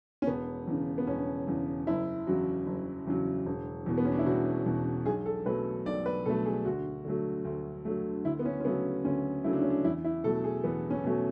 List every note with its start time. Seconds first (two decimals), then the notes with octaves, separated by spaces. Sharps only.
0.22 C#4
0.27 E1 B3
0.67 E2 C#3
0.98 B3
1.07 E1 C#4
1.47 E2 C#3
1.87 F#1 E4
2.27 E2 C#3 F#3 F#4
2.66 F#1
3.07 E2 C#3 F#3
3.46 E1
3.86 E2 B2
3.98 B3
4.05 C#4
4.12 D4
4.19 E4
4.26 E1 F#4
4.66 E2 B2
5.06 B1 G#4
5.26 A4
5.46 B2 F#3 A3 B4
5.86 B1 D5
6.06 B4
6.26 B2 F#3 A3 A4
6.45 G#4
6.65 D2 F#4
7.05 D3 F#3 A3
7.45 D2
7.85 D3 F#3 A3
8.25 D2 E4
8.39 B3
8.45 C#4
8.60 C#4
8.65 C#3 F#3 A3 B3
9.05 D2 C#4
9.44 C#3 F#3 A3 E4
9.53 D4
9.62 C#4
9.70 D4
9.84 E2 E4
10.04 E4
10.24 B2 F#3 A3 A4
10.44 G#4
10.64 E2 B3
10.90 C#4
11.04 B2 F#3 A3